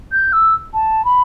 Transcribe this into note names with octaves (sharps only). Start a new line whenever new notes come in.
G6
E6
A5
B5